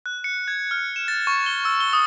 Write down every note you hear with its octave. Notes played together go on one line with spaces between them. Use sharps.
F#6
C#7
G#6
F6
E7
A6
C#6
G7
E6
G7
D#6